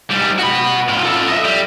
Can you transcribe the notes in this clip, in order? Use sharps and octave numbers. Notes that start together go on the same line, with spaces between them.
G#2 G3
F#4 B5
A2 F4
F4 A4
D#5 E5
G3